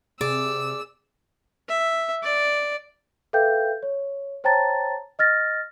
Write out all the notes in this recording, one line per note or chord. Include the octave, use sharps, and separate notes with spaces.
C3 G#4 D5 E6
E5
D5
A4 B4 E5 F5 G5 G6
C#5
C5 C#5 G5 A5 A#5 A6
D#5 F6 A6 A#6